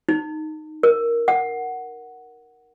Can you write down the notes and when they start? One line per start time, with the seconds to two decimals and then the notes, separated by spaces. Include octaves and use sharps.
0.09 D#4
0.83 A#4
1.28 F#5